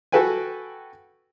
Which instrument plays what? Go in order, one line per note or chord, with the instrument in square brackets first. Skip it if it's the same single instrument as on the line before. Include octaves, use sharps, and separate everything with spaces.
[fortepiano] F#4 A4 B4 G5 G#5